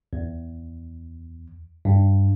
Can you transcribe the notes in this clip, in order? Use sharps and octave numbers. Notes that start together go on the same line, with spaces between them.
E2
G2